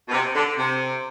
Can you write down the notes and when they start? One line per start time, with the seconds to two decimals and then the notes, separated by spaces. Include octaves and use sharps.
0.08 B2
0.13 C3
0.35 D3
0.58 C3